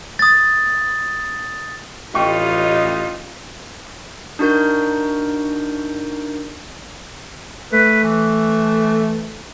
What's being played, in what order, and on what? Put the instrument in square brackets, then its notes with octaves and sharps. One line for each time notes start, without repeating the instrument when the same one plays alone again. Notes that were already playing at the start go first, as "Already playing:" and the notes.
[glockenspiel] D#6 A6
[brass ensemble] A1 D#5 [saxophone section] G2 G3 D#4 [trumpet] F4 [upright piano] G5 C#6
[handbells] D4 D#4 F#4 A#4 G6
[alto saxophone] A3 [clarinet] B4
[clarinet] E3